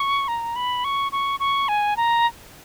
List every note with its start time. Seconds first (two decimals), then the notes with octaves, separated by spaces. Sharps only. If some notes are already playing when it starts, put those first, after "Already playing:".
Already playing: C#6
0.28 A#5
0.56 B5
0.84 C#6
1.12 C#6
1.40 C#6
1.68 G#5
1.97 A#5